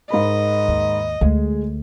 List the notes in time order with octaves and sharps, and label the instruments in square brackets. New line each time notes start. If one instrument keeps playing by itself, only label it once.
[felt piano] G#2 A#4 B5 [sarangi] D#5
[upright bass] D#2
[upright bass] D2 [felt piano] G#3 G#4